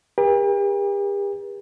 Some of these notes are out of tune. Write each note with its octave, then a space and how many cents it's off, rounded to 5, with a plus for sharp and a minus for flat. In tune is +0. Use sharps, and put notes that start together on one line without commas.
G4 +40 A#4 +45